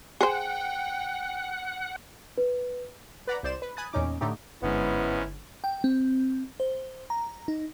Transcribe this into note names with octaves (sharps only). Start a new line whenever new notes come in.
G#4 C5 F#5 G5
B4
B4 D5 F#5 A#5 B5
C2 C5 D5 E7
B4
G#5 B5 D#6 F#6 A6
E2 A#2 C#4 D#4 D6
A2 D3 A3 D#4 G4
G1 G#2 D3 G#3 B3 C#4 E4
G5
C4
C5
A#5
D#4